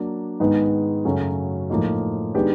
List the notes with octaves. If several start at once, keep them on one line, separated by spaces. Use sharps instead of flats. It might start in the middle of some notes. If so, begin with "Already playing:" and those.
Already playing: F#3 A#3 D4
G#2 D#3 G#3 B3
F#2 C#3 F#3 A3 C#4
A2 F3 A#3 D#4
D#3 G#3 B3 D4 G4